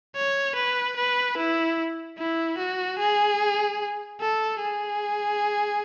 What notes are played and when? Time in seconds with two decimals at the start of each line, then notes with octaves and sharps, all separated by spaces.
0.15 C#5
0.56 B4
0.97 B4
1.38 E4
2.18 E4
2.58 F#4
2.99 G#4
4.21 A4
4.61 G#4